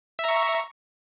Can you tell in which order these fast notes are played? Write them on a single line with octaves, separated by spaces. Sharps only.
E5 A#5 C#6